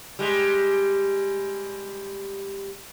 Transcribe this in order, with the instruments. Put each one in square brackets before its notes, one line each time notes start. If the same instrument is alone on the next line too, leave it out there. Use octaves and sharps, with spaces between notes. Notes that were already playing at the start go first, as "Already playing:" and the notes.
[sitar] G3 G#3